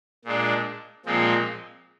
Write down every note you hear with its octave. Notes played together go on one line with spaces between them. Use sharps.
A#2 G#3 D4
A#2 F3 G#3 C4